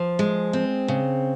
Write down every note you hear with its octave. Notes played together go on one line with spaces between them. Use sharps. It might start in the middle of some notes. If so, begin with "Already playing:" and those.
Already playing: F3
G#3
C4
C#3